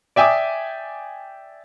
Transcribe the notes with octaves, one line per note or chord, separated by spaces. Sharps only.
D5 E5 G5 G#5 D6 D#6